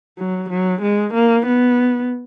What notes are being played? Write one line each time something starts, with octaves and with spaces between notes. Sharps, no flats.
F#3
F#3
G#3
A#3
B3